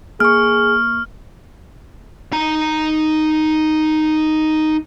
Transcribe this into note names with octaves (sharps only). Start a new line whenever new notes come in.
A#3 G#4 C#6 F6
D#4 A#5